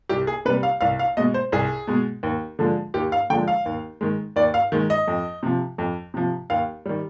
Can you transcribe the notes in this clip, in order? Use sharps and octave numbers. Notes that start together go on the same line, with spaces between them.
C2 G4
G#4
C3 G3 B4
F5
C2 F5
F5
B2 G#3 D#5
C5
C2 G#4
B2 G#3
D#2
D3 F3 G#3
D#2 G4
F5
D3 F3 G#3 G5
F5
D#2
D#3 G#3
D#2 D5
F5
D#3 G#3
D#5
F2
C3 F3
F2
C3 F3
D#2 F5
D#3 G3